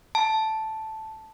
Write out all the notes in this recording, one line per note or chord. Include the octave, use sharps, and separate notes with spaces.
A5